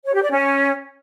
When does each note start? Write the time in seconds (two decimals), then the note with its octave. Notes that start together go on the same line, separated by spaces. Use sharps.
0.05 C#5
0.13 G4
0.22 D5
0.30 C#4